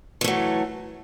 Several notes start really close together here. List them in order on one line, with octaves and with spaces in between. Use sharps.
E3 A3 F#3